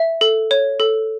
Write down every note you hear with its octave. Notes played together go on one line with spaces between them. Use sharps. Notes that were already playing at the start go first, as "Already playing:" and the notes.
Already playing: E5
A4
C#5
A4